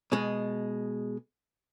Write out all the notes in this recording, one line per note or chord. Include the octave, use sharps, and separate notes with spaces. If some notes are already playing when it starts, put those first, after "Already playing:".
B2 G#3